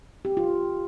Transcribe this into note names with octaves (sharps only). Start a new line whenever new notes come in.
C4 G4
F4